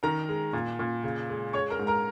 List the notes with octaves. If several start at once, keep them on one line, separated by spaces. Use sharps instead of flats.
D#3 A#4 A#5
G#3
A#2
A#2
C#3
G#3
G#3 C#5 C#6
A#4 A#5
G#2
A#4 A#5